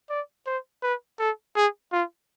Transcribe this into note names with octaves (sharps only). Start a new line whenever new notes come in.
D5
C5
B4
A4
G#4
F4